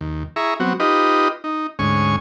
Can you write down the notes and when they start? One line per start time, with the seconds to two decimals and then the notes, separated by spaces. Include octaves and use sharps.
0.01 D#2
0.36 E4 G#4 E5 A#5 C#6
0.60 F#3 B3 C4 F#4
0.80 D#4 F4 G4 B4 D#5
1.44 D#4
1.79 D2 G#2 C#4 G#5 C#6